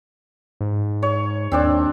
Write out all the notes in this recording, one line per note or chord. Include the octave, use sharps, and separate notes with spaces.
G#2
C#5
D#2 C4 D4 D5